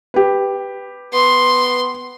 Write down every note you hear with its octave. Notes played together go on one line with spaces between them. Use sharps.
G4 B4
B3 C6